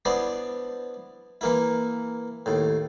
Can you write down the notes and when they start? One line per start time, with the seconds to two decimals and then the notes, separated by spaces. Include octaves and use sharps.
0.05 B3 D4 E4 C5 D5 D#5
1.41 E3 A#3 E4
2.46 D#2 A2